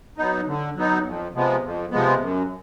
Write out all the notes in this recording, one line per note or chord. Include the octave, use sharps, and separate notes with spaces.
F#3 B3 D#4
D3
F#3 B3 D#4
F2
C3 F3 G#3 B3
F2
C3 F3 G#3 B3
F#2